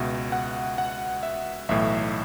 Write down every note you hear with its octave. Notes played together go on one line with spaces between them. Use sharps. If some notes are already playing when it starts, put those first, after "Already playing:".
Already playing: C#2 B2 E5
F#5
F#5
E5
B1 A2 E3 E5